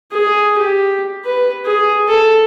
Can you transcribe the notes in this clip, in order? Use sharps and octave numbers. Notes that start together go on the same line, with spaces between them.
G#4
G4
B4
G#4
A4